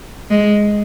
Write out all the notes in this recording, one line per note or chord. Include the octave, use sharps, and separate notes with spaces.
G#3